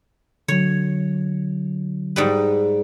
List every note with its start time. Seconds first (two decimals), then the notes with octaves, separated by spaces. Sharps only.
0.48 D3 F#3 C#5
2.16 G#2 G3 B4